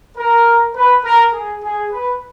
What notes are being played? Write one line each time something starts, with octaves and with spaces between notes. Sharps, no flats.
A#4
B4
A#4
G#4
G#4
B4